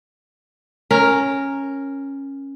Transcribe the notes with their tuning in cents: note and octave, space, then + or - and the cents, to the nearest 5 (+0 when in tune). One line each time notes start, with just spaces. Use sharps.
C#4 -10 A#4 +0